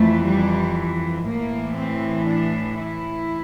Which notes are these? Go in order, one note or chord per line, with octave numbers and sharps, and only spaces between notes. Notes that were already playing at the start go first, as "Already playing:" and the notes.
Already playing: F2 E3 A3
G3
A2 E3 A#3
C4
D4
E4